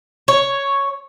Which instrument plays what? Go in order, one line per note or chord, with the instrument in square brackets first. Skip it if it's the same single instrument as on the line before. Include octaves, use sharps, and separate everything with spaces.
[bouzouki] C#5